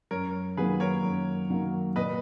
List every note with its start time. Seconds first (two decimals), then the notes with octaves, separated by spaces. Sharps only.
0.11 F#2 A#4 C#5
0.57 D#3 F#3 A#3 G#4 B4
0.80 A#4 C#5
1.04 F#2
1.50 D#3 F#3 A#3
1.96 A#2 B4 D#5